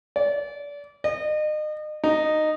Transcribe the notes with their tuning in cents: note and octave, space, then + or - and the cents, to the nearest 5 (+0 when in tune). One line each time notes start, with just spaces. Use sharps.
D5 -30
D#5 -35
D#4 -10